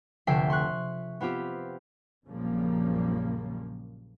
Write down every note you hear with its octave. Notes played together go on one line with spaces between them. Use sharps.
F1 D2 D3 E5 G5 C7
C6 C#6 F#6
B3 C4 F4 G4
A#1 F#2 C#3 F3 G3 A#3